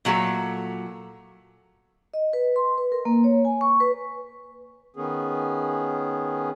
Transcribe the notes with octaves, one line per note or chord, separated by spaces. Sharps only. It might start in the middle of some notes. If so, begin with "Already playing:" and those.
A#2 F#3 A3 A4
D#5
B4
C6
B4
A#4
A#3
C#5
G#5
C#6
B4
D#3 B3 C#4 G#4